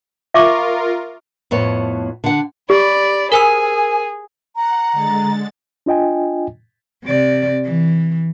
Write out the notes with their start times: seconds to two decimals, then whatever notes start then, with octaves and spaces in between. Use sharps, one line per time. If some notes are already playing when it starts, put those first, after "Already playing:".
0.34 F4 A#4 E5 C#6 D6
1.51 F2 A2 B3 C#5
2.24 D3 F#5
2.70 G4 D5 B5
3.32 G#4 A#4 C5 G#5 E6
4.56 F#5 A#5
4.93 D3 G#3 A6
5.86 D4 F4 D#5 G5 G#5
7.04 C3 D5
7.65 E3